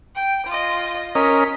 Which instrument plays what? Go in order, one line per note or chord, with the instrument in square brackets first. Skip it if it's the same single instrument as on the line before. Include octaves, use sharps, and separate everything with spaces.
[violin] G5
F4 D#5
[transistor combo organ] C#4 A#4 D#5 [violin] B6